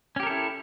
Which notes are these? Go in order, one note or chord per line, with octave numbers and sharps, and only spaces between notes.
C#4 E4 G4 A4 A#4